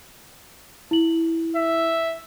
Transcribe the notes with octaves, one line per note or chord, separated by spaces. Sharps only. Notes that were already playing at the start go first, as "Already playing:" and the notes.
E4 F#7
E5